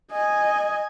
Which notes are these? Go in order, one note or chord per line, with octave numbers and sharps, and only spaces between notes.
D#5 G#5